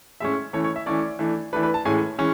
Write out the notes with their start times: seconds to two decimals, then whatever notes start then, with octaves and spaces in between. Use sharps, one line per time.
0.20 A2 G#3 C#4 E5
0.53 E3 A3 C#4 C#5
0.64 C#5
0.76 E5
0.86 E3 A3 C#4 D5
1.19 E3 A3 D4
1.53 E3 A3 D4 B4
1.63 B4
1.74 A5
1.85 A2 E3 G#3 C#4 G#5
2.18 E3 G#3 C#4